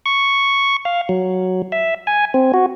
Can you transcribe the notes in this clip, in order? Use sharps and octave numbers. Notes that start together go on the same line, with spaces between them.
C#6
F5
F#3
E5
G#5
C4
F#4